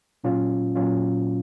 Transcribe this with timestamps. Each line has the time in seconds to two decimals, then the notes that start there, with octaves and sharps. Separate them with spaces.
0.24 A#2 F#3 C#4 F4
0.75 A#2 F#3 C#4 F4